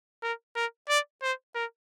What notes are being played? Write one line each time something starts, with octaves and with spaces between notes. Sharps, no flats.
A#4
A#4
D5
C5
A#4